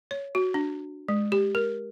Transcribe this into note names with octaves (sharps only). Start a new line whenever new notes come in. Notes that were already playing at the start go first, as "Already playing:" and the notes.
C#5
F#4
D4
G#3
G4
A#4